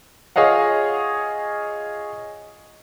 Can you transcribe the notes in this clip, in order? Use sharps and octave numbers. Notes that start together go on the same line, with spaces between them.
F4 G#4 C#5 D#5 F5 F#5